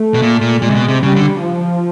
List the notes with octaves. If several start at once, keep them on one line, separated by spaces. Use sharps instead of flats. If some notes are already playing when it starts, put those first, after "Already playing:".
Already playing: A3
B2
A#2
A#2
A#2 G#3
C3
B2
C3
C#3 G3
D3
F3